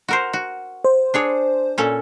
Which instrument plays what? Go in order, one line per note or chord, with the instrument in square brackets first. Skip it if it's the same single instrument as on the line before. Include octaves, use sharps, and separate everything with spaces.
[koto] F#4 A#4 C5
F#4
[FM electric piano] C5
[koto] D4 G#4 C#5
A#2 C#4 A4